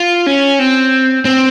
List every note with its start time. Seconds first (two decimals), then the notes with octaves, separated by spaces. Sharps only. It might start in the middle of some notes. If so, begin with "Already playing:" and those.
Already playing: F4
0.26 C#4
0.59 C4
1.25 C4